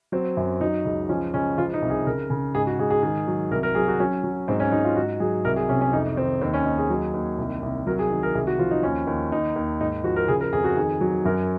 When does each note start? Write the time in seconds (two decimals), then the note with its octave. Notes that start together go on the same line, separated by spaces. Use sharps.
0.12 F#3 C4
0.37 F#2
0.61 F#3 D#4
0.85 C#2
1.09 F3 C#4
1.33 C#2 C#4
1.58 F3 F4
1.74 D#4
1.82 C2
1.90 G#4
2.06 C#3 A#4
2.30 C#3
2.55 G#2 G#4
2.67 F#4
2.79 G#2 G#4
2.90 G#4
3.03 D#3 G#4
3.27 F#3
3.51 C2 A#4
3.63 A#4
3.75 F#3 G#4
3.88 F#4
4.00 F#3 C#4
4.24 F#3
4.48 G#2 C4
4.60 C#4
4.72 G#2 D#4
4.84 F4
4.96 G#2 F#4
5.20 F#3 G#4
5.45 C2 A#4
5.56 G#4
5.69 C3 C#4
5.81 C#4
5.93 F2 D#4
6.17 D#3 C4
6.42 D#2 C4
6.54 C#4
6.65 D#2 D#4
6.78 G#4
6.90 F#3
7.14 D#2
7.38 C2
7.63 C2
7.87 F#3 A#4
7.99 G#4
8.11 D#3
8.23 A#4
8.35 C2 G#4
8.47 F#4
8.59 F3 F4
8.71 D#4
8.83 D#2 C#4
9.07 D#2
9.32 D#2 D#4
9.56 D#2
9.80 G#2 D#4
10.04 F3 F#4
10.16 A#4
10.28 C#3 G#4
10.41 A#4
10.53 F2 G#4
10.64 F#4
10.77 D#3 G#4
11.01 F#3
11.25 F#2 A#4